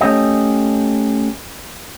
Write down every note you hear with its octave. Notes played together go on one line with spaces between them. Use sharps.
A3 C#4 G4 D#5